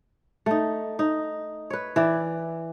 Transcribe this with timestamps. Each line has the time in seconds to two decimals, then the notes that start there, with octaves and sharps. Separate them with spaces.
0.46 A3 D#4
0.99 D#4
1.70 B4 C#5
1.96 E3 E4 D5